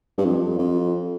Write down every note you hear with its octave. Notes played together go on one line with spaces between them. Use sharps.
G2
F2
F2